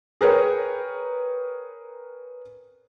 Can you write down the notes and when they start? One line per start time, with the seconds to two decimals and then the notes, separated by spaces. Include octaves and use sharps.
0.21 G#4 A#4 B4 C#5 G5